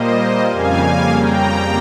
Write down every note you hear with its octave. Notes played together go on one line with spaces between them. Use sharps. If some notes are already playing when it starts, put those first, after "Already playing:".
Already playing: A#2 G3 A#3 C5 D#5
F2 C#3 G3 A#3 F5 G#5
G5 A#5